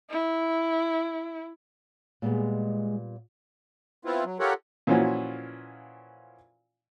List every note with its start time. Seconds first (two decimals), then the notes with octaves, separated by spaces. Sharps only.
0.10 E4
2.22 A#2 G3 G#3 B3
4.05 B3 C4 E4 F4
4.25 F#3
4.39 F4 G4 A4 A#4 C#5 F#5
4.87 A#2 E3 F3 C#4 F4 F#4